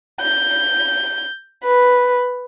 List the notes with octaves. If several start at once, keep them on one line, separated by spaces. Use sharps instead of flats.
G6
B4